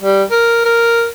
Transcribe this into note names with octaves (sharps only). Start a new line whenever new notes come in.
G3
A#4
A#4